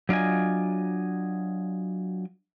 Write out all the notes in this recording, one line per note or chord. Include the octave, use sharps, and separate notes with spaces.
F#3 D4 F4 D#5 G#5